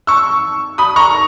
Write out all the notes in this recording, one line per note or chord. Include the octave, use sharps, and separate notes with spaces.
C#6 E6
B5 D#6
A#5 C#6